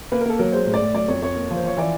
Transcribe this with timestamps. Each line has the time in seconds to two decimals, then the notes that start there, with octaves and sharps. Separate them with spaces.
0.12 A#3 B4
0.21 A#4
0.26 A#3 A4
0.39 F#3 A#4
0.53 G#3 C5
0.67 A2
0.74 D5
0.81 A2
0.94 F#3 D5
1.08 F2 C#5
1.22 F2 C#5
1.36 A#3
1.51 F3
1.56 C5
1.63 F3 C#5
1.77 E3 D5